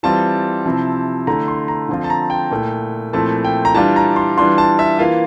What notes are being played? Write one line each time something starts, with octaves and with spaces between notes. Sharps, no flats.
E3 G3 C4 F4 A5
C3 F3 C4 E4
D3 A3 E4 A#5
C6
A#5
D3 F3 C4 F4
A5
A#5
G5
A#2 A3 E4
A#2 F3 A3 C4 E4 A5
G5
A#5
E3 G3 D4 F4 A5
A#5
C6
E3 G3 D4 F4 C6
A5
E5
E3 A#3 F4 F5